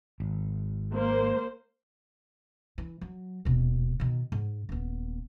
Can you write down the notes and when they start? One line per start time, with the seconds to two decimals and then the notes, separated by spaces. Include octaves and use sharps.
0.20 G#1
0.94 A#3 C5
2.78 E3
3.01 F#3
3.45 D#1 B2
4.00 B2 D#3
4.32 G#2
4.69 D#1 B3